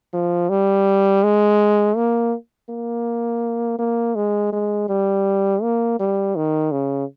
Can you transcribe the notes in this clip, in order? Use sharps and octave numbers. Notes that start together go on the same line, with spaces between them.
F3
G3
G#3
A#3
A#3
A#3
G#3
G#3
G3
A#3
G3
D#3
C#3